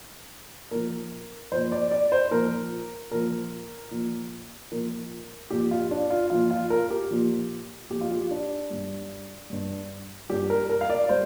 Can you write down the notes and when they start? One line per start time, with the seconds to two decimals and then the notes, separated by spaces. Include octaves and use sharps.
0.71 A#2 F3 A#4
1.52 A#2 F3 C5
1.72 D5
1.91 D5
2.12 C5
2.31 A#2 F3 A#4
3.11 A#2 F3 A#4
3.91 A#2 F3
4.72 A#2 F3 A#4
5.50 A#2 F3 G4
5.71 F4
5.91 D4
6.10 F4
6.30 A#2 F3 F4
6.51 F4
6.70 A#4
6.90 G4
7.11 A#2 F3
7.90 A#2 F3 G4
8.01 F4
8.12 G4
8.31 D4
8.70 G2 G3
9.50 G2 G3
10.30 G2 G3 G4
10.50 A#4
10.69 A#4
10.81 F5
10.90 D5
11.09 G3 C5